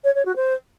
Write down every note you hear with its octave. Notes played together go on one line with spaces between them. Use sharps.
C#5
C#5
F#4
C5